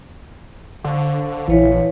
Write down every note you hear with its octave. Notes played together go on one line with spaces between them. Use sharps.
D3 C5 F5 C#6
A#1 E3 B4 C#5 F5